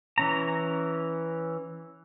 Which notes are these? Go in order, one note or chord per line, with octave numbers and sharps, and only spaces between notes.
E3 C#4 A#5